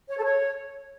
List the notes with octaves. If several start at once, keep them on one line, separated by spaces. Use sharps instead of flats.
C#5
A4
C#5